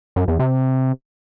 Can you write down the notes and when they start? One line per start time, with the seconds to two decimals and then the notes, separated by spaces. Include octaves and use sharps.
0.16 F#2
0.28 E2
0.39 C3